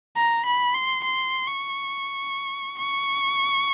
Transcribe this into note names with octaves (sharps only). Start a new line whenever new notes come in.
A#5
B5
C6
C6
C#6
C#6